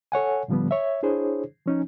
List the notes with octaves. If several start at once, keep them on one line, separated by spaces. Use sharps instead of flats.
A4 C#5 F#5 G#5
A2 D3 F3 G3 B3
C#5 E5
D4 E4 G#4 C5 C#5
F3 C#4 D#4